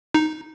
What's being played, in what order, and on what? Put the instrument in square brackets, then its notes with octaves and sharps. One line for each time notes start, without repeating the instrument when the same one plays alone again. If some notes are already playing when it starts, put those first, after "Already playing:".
[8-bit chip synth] D#4